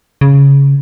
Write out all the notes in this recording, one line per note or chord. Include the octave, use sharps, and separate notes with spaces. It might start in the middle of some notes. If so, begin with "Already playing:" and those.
C#3